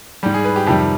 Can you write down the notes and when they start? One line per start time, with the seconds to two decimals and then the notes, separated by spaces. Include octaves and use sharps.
0.23 G#2 G3 G4
0.34 G#4
0.45 B4
0.56 G4
0.66 F2 C3 D#3 G3 G4